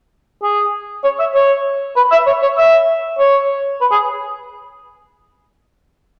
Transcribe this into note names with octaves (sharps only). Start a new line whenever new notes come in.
G#4
C#5
E5
C#5
B4
E5
C#5
C#5
E5
C#5
B4
G#4